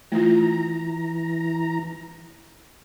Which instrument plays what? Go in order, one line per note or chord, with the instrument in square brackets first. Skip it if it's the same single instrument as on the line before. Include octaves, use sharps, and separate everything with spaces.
[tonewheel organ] E3 A#5 [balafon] A3 F4